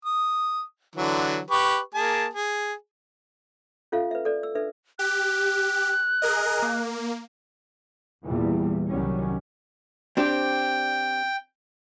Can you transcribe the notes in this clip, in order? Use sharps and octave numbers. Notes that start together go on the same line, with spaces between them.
D#6
D3 E3 F#3
G4 B4 C#6
A#3 G#4 A5
G#4
C#4 F4 A4 E5 F5
B4 E5
A4 D5
E6
D4 A4 B4 E5
G4 F#6
G#4 A#4 D#5
A#3
E2 A#2 E3 G3
C2 D#3 F#3 G3 C#4
C4 D4 G4 G5